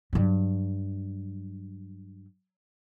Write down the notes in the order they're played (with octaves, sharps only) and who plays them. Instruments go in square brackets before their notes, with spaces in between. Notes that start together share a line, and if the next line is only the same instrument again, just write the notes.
[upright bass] G2 F#3